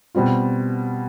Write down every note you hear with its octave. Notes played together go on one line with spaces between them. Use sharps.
B2 G3 C4 F4